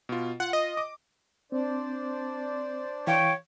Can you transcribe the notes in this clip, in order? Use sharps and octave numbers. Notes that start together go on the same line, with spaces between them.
B2 F4
F4 F#5
D#5
D6
C4 D4 C5 D5
E3 C#5 F5 G5 C#6